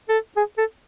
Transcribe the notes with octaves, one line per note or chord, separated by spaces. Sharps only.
A4
G#4
A4